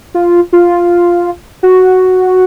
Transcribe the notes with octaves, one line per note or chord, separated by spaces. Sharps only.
F4
F4
F#4